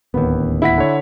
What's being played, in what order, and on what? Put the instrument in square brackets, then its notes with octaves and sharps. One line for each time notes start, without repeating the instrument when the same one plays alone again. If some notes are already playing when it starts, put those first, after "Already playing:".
[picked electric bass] D1 D#2 [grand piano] B3
[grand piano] E4 F#5 B6
[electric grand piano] D3 C#5